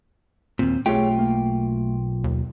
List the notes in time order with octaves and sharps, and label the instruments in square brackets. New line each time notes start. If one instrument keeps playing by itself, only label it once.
[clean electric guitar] D#2 A#2 [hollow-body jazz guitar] C4
[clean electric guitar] B1 F4 G5 [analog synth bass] A3 [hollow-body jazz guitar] G4 G#4 C#5
[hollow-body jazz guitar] A#3
[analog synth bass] D#2